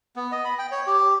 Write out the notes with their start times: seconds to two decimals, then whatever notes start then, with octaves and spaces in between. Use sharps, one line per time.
0.16 B3
0.32 D#5
0.45 B5
0.59 G5
0.72 C#5
0.87 G4